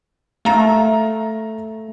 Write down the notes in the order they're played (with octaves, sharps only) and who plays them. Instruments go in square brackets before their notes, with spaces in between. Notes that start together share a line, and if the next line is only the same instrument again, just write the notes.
[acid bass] A3 [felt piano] F5 A#5